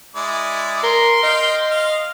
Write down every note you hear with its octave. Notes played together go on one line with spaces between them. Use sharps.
G#3 E4 D5
A#4 C6
D#5 F5 G5
F5